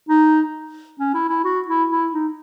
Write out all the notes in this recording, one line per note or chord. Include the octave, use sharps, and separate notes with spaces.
D#4
C#4
E4
E4
F#4
E4
E4
D#4